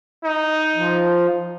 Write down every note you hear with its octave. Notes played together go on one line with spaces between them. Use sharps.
D#4
F3